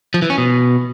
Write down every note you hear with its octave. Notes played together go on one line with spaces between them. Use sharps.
F3
E3
C#4
B2